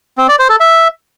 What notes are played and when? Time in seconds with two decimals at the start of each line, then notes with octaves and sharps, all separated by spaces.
0.18 C4
0.28 D5
0.39 C5
0.50 A4
0.60 E5